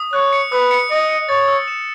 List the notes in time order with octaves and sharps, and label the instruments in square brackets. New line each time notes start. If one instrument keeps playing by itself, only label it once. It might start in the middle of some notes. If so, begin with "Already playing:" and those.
Already playing: [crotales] D#6
[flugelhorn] C#5 [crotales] F#6
[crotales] C#7
[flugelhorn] B4 [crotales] D#6
[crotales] C#7
[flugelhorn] D#5 [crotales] C#7
[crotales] C#7
[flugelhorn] C#5 [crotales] A6
[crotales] E6
E7